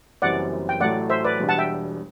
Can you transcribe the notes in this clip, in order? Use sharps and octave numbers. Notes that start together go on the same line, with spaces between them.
F#1 F#2 E3 G3 C4 D5 F#5
G5
A1 A2 F#3 A3 D5 F#5
C5 E5
B4 D5
E1 E2 B2 G3 D4
F#5 A5
E5 G5